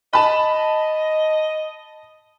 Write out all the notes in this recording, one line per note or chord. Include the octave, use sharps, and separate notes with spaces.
D#5 A5 B5